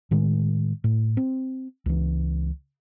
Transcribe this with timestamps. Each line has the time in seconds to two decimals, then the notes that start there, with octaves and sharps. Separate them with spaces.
0.11 A2 D#3 G#3
0.84 A2
1.17 C4
1.86 C#2 E3